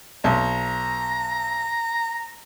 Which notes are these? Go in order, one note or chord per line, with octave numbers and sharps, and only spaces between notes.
B1 A#5